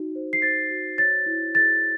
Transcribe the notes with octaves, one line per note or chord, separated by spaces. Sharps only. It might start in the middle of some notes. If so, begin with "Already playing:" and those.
Already playing: D#4 F#4
C5
C7
C5 A6
F#4
C#5 A6
E4
G#4 A6